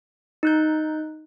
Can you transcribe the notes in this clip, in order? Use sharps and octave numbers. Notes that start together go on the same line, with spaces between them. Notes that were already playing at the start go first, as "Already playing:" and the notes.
D#4 F#6 G6